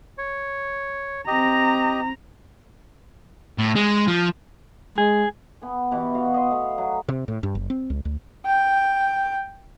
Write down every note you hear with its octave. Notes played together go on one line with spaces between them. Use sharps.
C#5
C4 G4 D#5 A#5
A2
G#3
F3
G#3 G#4
B3 G#5
B2 E3 G4
F#4 D#5 F5
D#5 C6
A3 F5
F#3
C3
A2
G2
F#1
C4
C#2
D2
G5